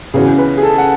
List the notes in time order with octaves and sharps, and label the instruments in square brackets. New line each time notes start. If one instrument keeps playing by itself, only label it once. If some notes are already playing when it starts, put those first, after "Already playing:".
[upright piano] C#3 E3 B3 F#4 C#5 [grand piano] G#4
[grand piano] B4
G#4
A4
F#5